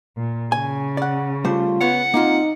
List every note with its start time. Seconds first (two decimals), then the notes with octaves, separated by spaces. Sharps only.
0.17 A#2
0.52 C#3 G#5
0.97 D5 F#5
1.45 G3 A3 F4 C5
1.81 B3 C#5 F#5
2.14 A#3 C4 D#4 F4